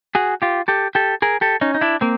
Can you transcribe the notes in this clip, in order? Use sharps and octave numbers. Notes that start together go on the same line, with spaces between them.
F#4 G#4
F4 G4
G4 A4
G4 A4
G#4 A#4
G4 A4
C#4 D#4
D#4
D4 E4
A#3 C4